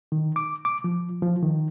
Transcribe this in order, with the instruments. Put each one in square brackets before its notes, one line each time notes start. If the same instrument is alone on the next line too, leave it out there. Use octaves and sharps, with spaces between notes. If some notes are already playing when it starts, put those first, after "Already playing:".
[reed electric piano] D#3
D6
D6
F3
F3
D#3